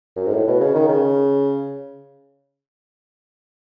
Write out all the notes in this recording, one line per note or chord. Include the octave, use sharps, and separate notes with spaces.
F#2
G#2
A2
B2
C#3
D#3
C#3